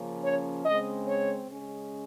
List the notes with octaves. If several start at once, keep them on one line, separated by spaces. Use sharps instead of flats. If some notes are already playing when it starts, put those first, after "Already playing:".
Already playing: C#3 F3 A#3 C#4
C#5
C#3 G#3 C4 D#5
C#5
C#3 G#3 C#4